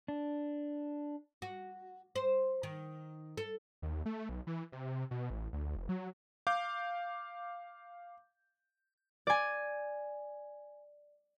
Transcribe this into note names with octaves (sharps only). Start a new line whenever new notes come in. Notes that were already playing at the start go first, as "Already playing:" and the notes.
D4
F#4
C5
D#3
A4
D#2
A3
B1
E3
C3
B2
A1
D2
F1
F#3
F5 D6 G6
D5 G#5